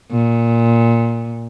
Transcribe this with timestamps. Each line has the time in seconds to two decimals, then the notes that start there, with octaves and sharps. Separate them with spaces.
0.12 A#2